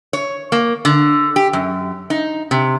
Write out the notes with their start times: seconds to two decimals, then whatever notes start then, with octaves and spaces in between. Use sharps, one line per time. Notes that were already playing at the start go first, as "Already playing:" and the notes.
0.13 C#5
0.52 A#3
0.85 D3
1.36 G4
1.53 F#2
2.10 D#4
2.51 C3